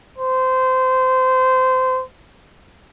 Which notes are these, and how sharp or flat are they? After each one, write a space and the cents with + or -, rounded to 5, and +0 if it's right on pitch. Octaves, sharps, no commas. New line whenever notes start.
C5 -20